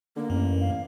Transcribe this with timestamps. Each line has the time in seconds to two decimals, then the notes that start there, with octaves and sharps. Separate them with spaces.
0.16 D3 A#3
0.30 A1 F#2
0.60 F5